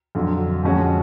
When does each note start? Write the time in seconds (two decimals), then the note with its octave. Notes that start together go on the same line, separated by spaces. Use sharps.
0.15 F2 D3 F#3
0.63 F2 F3 G#3 C#4 F#4